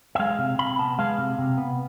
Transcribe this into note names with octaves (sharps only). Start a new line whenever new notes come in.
E5
G#3 F5
C3
C3 B5
B3 A5
G#3 F5
C3
C3
B3